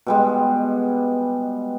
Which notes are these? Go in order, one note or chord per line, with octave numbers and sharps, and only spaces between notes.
B2 G3 G#3